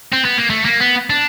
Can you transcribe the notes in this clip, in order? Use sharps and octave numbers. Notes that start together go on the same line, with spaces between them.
C4
B3
A#3
A3
A#3
B3
D4